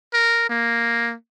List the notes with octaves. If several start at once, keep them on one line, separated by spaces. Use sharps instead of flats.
A#4
A#3